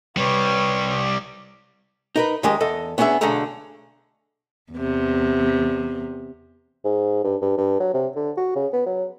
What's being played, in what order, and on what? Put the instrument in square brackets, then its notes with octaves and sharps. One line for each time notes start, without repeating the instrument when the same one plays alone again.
[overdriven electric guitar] C3 G3 [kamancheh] B4 C#5
[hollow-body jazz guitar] D#4 A#4 B4
F2 D#3 G#3 G4 A#4 D#5
E2 A4 D#5
B3 C#4 D4 G#4 E5
B1 D3 A3 G#4 A4 A#5
[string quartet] E2 C3
[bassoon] G#2
G2
G2
G2
F#3
C3
D3
F#4
C#3
B3
F#3